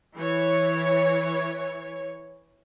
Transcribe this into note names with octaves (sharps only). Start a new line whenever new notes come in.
E3 C#5